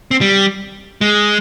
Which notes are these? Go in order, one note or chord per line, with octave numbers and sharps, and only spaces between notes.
C4
G3
G#3